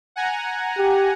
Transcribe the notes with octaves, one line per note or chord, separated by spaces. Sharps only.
F#5 G#5 A#5
G4